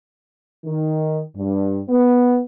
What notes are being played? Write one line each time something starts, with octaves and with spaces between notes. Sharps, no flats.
D#3
G2
B3